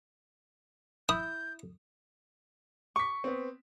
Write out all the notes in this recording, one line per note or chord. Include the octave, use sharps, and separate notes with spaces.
E4 D#6 G6
C#6 D6 B6
B3 C4